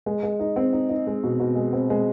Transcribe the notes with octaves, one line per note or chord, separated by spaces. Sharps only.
G#3
G#3
D#4
C4
D#4
D#4
G#3
B2
B2
G#3
C4
G#3